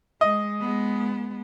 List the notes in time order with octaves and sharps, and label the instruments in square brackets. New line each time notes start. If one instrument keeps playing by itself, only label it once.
[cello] G#3 [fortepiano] D#5
[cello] G#3 B3